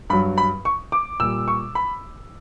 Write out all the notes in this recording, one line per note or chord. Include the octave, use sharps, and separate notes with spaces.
G2 F#3 B5
B5
C#6
D6
A#2 G3 E6
C#6
B5